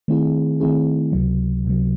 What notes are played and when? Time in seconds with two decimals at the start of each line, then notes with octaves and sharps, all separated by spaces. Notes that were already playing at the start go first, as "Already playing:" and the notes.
0.08 D#3 A3 C4 E4 G#4
0.60 D#3 A3 C4 E4 G#4
1.12 C#2 C3 F#3
1.65 C#2 C3 F#3